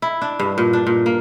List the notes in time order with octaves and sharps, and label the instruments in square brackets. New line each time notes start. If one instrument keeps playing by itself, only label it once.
[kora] E4
D4
G2
A#2
D4
A#2
A#3